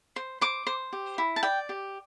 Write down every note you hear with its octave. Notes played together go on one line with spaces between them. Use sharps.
C5
C5 D6
C5
G4
E4
A5
D5 G5
G4